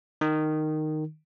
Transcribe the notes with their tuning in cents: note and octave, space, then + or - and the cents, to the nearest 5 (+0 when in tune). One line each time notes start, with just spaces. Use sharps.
D#3 -10